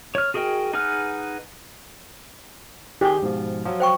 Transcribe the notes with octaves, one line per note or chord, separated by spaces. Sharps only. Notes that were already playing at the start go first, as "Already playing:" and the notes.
C#5 F6
F#4 G#4 A#4 D#5 G5
D#4 G#4 B4 F#5 F6
D#3 G4 G#4 G6
G#2 B2 F3
F3 F#3
C5 G5 C#6